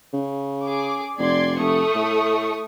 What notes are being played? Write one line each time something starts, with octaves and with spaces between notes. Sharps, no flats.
C#3
G#4 D6
F1 D5 C6 G#6
F1 A3 C#6 D#6
A2